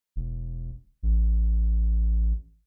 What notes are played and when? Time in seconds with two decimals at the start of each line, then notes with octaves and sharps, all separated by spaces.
0.16 E1
1.03 A1